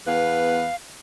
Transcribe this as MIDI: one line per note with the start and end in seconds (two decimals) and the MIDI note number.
0.07 0.67 40
0.07 0.67 59
0.07 0.67 71
0.07 0.76 77